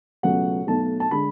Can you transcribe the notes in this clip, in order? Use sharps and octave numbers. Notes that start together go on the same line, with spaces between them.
C#2 B2 F#3 A3 F#5
B1 B2 F#3 A3 A5
A5
D3 G#3 B5